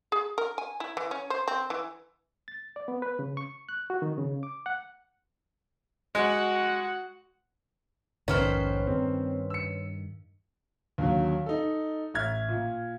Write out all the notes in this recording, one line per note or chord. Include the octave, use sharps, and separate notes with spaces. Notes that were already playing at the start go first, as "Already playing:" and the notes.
G#4
A#4
G#5
E4
E3
C#4
C5
C4
E3
A6
D5
B3
B4
C#3
C#6
F#6
F#4
D#3
C#3
D6
F#5
G#3 F#4 F#5
A#1 E2 G#2 D#3 C#4 B4 C5 F6
G2 D#3 C4
E6 C#7
D#2 D3 F#3
D#4 A4
A1 E5 F6 G#6
A#2